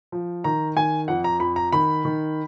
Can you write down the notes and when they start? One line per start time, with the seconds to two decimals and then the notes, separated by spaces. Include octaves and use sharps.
0.12 F3
0.44 D#3 A#5
0.76 D#3 G#5
1.08 F2 F#5
1.24 A#5
1.40 F2 B5
1.56 A#5
1.72 D#3 B5
2.05 D#3